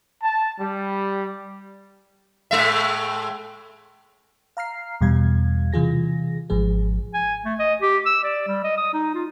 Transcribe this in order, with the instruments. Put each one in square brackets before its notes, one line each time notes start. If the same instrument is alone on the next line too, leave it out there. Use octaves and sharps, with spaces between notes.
[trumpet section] A5
G3
[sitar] A2 G#3 E5
[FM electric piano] F5 A#5 F6 C7
E2 B2 G3 F5 G#6
C3 E3 F4 G#4 A#6
G#1 G#2 F3 G#4
[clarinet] G#5
A3
D#5
G4
E6
D5
G3
D#5
D#6
D#4
F4